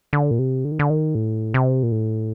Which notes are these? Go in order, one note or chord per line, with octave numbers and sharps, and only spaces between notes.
D3
A#2
C3
D3
D#3
D3
D#3
A2
C3
A#2
A2